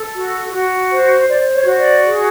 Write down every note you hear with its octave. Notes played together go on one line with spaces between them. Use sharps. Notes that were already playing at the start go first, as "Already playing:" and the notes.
Already playing: A4
F#4
F#4
C5
C5 D5
C#5
F#4
D5
G#4